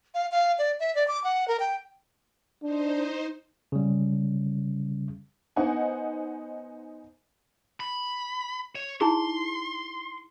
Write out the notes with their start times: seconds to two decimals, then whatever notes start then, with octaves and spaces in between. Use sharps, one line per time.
0.14 F5
0.32 F5
0.58 D5
0.80 E5
0.95 D5
1.08 D6
1.24 F#5
1.48 A#4
1.60 G5
2.63 D4 D#4 C5
3.72 C#3 G3
5.56 B3 D#4 C5 D#5 F#5 G#5
7.80 B5
8.75 C#5
9.01 D#4 E4 G#4 C6